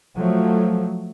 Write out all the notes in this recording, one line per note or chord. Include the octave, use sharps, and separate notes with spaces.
F3 F#3 A3